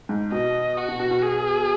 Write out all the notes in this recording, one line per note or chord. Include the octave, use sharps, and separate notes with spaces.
G#2
B2 D#5
F#4
B2
B2
B2
G#4